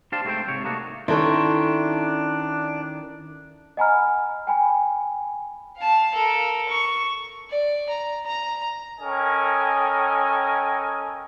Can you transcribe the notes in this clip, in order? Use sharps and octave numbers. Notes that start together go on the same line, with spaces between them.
D4 G4 C5 F5 A5 C6
G#2 A3 C4 F4 C5 G5
G#2 C3 C#5
A3 A#3 D4 D#4 F#4
D#3 C#4 D4 E4 A4 C#5 C6
D#5 F#5 G#5 A#5 B5 F6
G5 G#5 B5
F5 A5
A4 A#4
C#6
D5
A#5
A#5
C#4 A4 A#4 D#5 G5 G#5